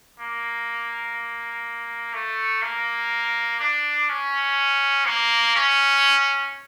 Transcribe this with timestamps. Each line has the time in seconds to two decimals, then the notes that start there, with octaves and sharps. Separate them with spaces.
0.20 A#3
2.14 A3
2.62 A#3
3.60 D4
4.09 C#4
5.06 A#3
5.56 C#4